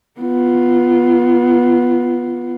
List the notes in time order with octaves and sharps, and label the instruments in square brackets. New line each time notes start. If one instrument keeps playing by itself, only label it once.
[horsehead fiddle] B3 F4